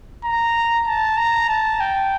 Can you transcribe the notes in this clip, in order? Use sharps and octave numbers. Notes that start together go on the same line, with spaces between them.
A#5
A5
A#5
A5
G5